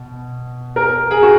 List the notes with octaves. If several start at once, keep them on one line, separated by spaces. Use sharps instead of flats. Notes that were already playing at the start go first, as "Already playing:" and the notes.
Already playing: B2
A#4
G#4
F#4